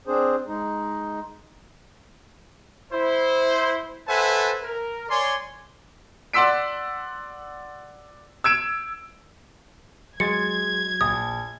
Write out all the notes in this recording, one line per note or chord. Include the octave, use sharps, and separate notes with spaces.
C4 D4 G#4 C5
G#3 D#4
E4 C5
A4 B4 C5 E5 F#5 G#5
A#4
C#5 D5 G#5 C6
D5 F#5 C6 E6 B6 D7
E6 G#6 D7 E7
F#3 G#3 C6 G#6 A6 C#7
A#1 A5 D#6